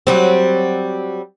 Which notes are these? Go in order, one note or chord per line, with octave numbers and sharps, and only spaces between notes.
F#3 G3 C4